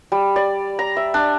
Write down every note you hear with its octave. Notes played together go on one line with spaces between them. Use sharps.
G3
D5
A#5
E5
D4